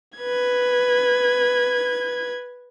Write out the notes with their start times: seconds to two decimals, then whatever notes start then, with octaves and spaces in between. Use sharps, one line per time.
0.18 B4 G#6